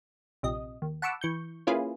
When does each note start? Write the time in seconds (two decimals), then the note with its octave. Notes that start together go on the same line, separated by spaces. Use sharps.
0.43 A#1 C3 D#5
0.82 D#2
1.02 F#5 A5 B5 C#6 D6 E6
1.21 E3 C#6 G6
1.67 A#3 C#4 E4 F4 G#4 B4